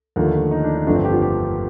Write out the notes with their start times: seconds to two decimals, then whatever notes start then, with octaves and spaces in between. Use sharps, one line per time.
0.16 D#2 D3 F3 A3
0.51 D#4
0.64 D4
0.75 D#4
0.86 G1 F2 D3 F3 A3 D4
0.95 C4
1.05 G4
1.13 F4
1.22 G4